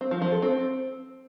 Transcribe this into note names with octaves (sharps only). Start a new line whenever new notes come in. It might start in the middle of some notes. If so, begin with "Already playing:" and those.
C4
F3
F3
A4
C4